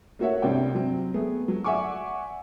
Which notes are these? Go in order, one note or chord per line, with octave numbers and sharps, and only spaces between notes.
A3 A#3 F#4 C#5 E5 F#5
C2 G2 C3 D5 G5
F#3 C4
A3 B3 G#4
F#3
D5 E5 F#5 G#5 C#6 D6